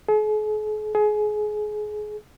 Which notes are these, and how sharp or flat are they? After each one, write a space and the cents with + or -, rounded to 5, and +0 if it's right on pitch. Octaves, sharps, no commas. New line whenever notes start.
G#4 +45
G#4 +25